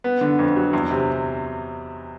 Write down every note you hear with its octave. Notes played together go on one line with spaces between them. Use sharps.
B3
D3
F2
F#3
E2
C3